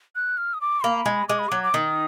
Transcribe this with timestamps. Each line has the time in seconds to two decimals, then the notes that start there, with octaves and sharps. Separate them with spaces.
0.16 F#6
0.37 F6
0.54 D#6
0.61 D6
0.84 A#3 B5
1.06 G#3
1.29 G#3 D6
1.39 B5
1.49 F#3 D6
1.63 D6
1.74 D#3 D#6